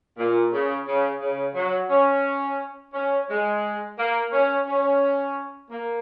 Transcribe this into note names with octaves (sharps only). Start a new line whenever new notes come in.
A#2
C#3
C#3
C#3
F#3
C#4
C#4
G#3
A#3
C#4
C#4
A#3